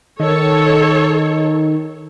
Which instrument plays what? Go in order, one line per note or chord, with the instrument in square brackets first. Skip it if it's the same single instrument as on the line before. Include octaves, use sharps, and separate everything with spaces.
[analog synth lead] D#3 [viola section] A4 C#5